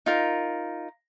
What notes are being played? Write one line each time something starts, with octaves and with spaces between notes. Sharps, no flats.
D#4 F4 A#4